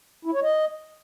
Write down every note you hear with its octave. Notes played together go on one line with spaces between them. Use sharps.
E4
C#5
D#5